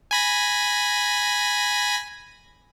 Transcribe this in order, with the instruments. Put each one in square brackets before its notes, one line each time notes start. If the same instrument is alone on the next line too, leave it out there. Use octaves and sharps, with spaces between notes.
[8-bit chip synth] G#5 B5 A#6